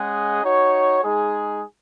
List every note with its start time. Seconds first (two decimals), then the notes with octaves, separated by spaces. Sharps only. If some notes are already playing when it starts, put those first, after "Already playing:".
Already playing: G#3 C#4 G#4 D#5 F#5
0.44 D#4 F#4 C#5
1.03 G#3 D#4 G#4